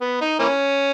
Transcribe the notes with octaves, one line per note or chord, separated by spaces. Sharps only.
B3
D#4
E3 A#3 C#4